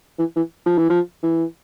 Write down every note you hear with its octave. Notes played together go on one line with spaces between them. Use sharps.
E3
E3
F3
E3
F3
E3